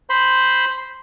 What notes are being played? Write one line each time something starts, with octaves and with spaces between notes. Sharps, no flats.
C5 B5 C6